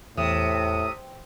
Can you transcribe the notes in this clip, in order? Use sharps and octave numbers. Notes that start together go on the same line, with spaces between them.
E2 A2 C3 D#6